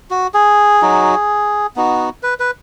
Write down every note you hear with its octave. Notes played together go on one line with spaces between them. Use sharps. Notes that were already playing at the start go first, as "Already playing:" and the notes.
F#4
G#4
F#3 D#4 F#4
B3 D#4 F#4
B4
B4